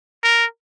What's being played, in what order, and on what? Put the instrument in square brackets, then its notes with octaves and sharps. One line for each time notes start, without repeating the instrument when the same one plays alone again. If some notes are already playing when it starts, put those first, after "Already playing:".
[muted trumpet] A#4